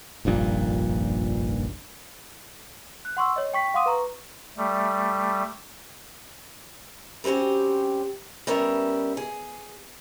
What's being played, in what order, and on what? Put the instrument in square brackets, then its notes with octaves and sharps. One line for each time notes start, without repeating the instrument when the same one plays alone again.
[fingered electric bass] F1 A#1 G2 A#2
[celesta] F#6
F#5 C6 C#6 E6
C#5 D#5
G5 C#6 B6
F5 F#5 C6 D6 D#6 D#7
B4 A#5 C#6
[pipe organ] G3 A3
[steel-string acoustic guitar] G3 C4 C#4 F#4 G4
G3 B3 C#4 A#4 E5
G#4